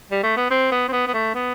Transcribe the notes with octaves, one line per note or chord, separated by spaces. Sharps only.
G3
A3
B3
C4
B3
C4
B3
B3
A3
B3